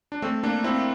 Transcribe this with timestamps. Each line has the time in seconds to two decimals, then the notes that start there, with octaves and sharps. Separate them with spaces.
0.12 D4
0.22 A3 C4
0.43 A#3 D4
0.64 C4 E4